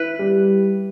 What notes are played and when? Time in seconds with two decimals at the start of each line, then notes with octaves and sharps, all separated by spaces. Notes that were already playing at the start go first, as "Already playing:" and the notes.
Already playing: E4 B4
0.19 G3